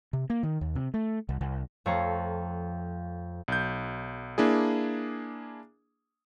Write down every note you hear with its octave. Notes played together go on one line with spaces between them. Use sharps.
C3
A#3
D#3
D#2
C3
A3
C2
C2
F2 A3 C4 C#5 F5 A#5
B1 G6
A#3 D4 E4 G#4